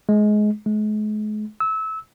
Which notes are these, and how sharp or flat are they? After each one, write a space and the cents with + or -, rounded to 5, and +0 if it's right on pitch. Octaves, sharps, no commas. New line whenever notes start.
G#3 +20
G#3 +40
E6 -25